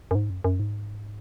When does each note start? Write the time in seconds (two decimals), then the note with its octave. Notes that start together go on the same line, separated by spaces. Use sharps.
0.11 F#2
0.15 G#2
0.30 F#2
0.44 F#2
0.60 G#2